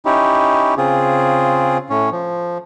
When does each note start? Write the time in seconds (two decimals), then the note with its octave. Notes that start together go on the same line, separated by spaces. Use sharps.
0.05 C#4 D#4 E4 G4
0.78 C#3 C4 F4 G#4
1.90 A2 C#4
2.12 F3